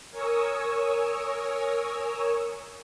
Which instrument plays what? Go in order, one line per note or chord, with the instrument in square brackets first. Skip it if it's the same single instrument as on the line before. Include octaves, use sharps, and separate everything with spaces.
[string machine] A#4 C#5 G#5 C#6 D#6 E6